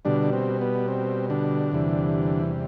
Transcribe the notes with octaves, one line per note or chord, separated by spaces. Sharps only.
B2 D3 G3 D4
C4
B3
C4
D3 D4
E2 C3 E3 G3